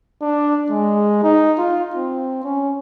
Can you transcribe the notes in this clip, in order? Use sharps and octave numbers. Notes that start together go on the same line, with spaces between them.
D4
G#3
D#4
F4
C4
C#4